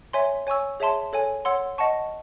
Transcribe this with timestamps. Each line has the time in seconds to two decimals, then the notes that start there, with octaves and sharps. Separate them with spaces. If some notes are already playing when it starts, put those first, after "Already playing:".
0.13 C#5 E5 G#5 C6
0.47 C#5 G#5 C#6 E6
0.80 G#4 C#5 E5 A5 C6
1.13 A4 C#5 G#5
1.45 C#5 F#5 C6 E6
1.78 D#5 F#5 A5 C#6